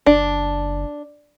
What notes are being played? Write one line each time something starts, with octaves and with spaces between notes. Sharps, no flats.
F#1 D4